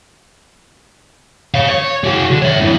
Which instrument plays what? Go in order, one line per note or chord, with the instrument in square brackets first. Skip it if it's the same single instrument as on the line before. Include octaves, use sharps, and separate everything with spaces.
[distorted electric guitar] C#5 F5
C#5
F#4 G#4
D3
C#5 E5
G2 E3